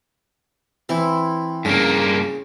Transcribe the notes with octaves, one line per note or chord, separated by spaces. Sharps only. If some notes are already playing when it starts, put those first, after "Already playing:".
E3 C4 E4
G2 C#3 A#3